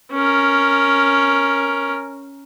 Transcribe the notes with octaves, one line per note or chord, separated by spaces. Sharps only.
C#4 A#4